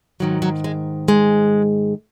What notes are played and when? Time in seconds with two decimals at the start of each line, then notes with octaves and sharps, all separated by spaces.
0.20 G#2 D#3 F#3
0.42 F#3
0.64 G#3
1.08 G#3